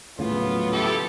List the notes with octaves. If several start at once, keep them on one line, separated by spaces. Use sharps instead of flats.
D#1 A2 C#3 F#3 B3 F4
E4 G4 A4